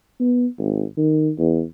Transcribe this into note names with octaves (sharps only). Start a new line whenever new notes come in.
B3
G#1
D#3
E2